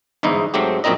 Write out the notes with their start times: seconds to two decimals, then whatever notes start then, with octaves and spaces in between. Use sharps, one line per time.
0.23 G1 E2 G#2 D#4 E4
0.54 G#2 F#3 A3 C4 G4
0.84 A#1 F#2 A#2 C4 D#4 D#5